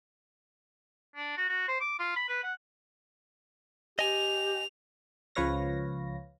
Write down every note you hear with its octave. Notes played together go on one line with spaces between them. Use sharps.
D4
F#4
F#4
C5
D6
F4
B5
B4
F#5
G4 D#5 G#5 F7
C#2 F3 B4 C#5 F5 A#6